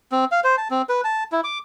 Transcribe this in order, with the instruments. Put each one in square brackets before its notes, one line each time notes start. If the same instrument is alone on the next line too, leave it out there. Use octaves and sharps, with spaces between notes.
[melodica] C4
F5
C5
A5
C4
B4
A5
E4
D6